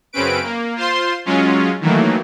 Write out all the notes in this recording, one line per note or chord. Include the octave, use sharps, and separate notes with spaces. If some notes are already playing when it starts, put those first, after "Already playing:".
F#2 C#3 C4 C#4 B4 D7
A#3
F4 C5 C6
F#3 G#3 C#4 F4
D#3 E3 F#3 A3 A#3